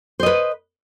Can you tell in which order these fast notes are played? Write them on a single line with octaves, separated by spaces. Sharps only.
C5 D#5 B4